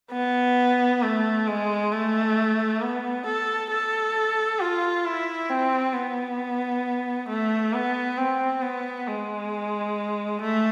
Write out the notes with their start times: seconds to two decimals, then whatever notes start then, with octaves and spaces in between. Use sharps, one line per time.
0.13 B3
1.02 A3
1.47 G#3
1.92 A3
2.82 B3
3.26 A4
3.71 A4
4.60 F4
5.05 E4
5.49 C4
5.94 B3
7.29 A3
7.73 B3
8.18 C4
8.62 B3
9.08 G#3
10.42 A3